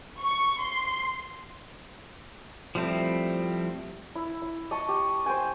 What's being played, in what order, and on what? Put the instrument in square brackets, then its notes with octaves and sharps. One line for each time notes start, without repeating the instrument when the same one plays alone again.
[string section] C#6
C6
[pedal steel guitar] F3 G3 A3 C4 E4
[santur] E4
E4
D#5 A5 C#6
G4
C5 G5 G#5